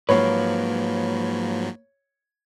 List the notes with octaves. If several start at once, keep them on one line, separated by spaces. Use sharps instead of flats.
G#2 F3 F#3 A#3 B4 C#5